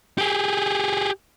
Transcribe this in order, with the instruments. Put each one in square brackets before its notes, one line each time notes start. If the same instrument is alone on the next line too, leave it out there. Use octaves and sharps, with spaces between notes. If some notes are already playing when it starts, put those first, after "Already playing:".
[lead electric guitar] G4 G#4